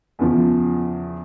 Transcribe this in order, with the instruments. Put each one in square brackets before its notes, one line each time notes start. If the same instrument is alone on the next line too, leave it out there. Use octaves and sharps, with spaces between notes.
[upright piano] E2 C#3 F3